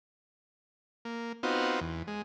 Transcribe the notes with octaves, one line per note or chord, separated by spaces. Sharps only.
A#3
B3 C4 D#4 F4 F#4
E2
G#3